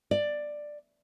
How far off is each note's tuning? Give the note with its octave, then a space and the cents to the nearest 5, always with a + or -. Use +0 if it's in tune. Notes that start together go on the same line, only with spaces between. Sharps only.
D5 +10